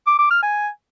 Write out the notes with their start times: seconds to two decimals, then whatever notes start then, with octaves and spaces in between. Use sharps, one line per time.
0.07 D6
0.19 D6
0.31 F6
0.42 G#5